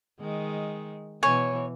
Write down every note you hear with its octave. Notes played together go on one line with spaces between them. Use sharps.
D#3 G#3
B2 E3 C#5 G#5